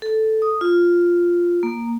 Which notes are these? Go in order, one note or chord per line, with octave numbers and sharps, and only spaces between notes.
A4
D#6
F4
A#3